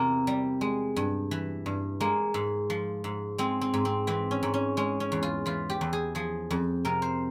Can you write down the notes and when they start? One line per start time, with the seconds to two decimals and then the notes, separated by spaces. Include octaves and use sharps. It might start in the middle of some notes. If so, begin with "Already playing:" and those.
Already playing: E2 C3 A#3 C4
0.27 G3
0.61 G#3
0.96 G2
1.31 E3
1.66 G2
2.00 G#3 A#3
2.34 G#2
2.70 F3
3.04 G#2
3.38 G#3 C4
3.61 C4
3.74 G#2
3.85 C4
4.07 E3 C4
4.31 C#4
4.43 G#2
4.54 C#4
4.77 G#3 C#4
5.00 C#4
5.12 E2
5.23 F4
5.46 E3 F4
5.70 G4
5.81 E2
5.93 G#4
6.15 F3 G#4
6.51 F2
6.85 C3 A#4
7.02 C5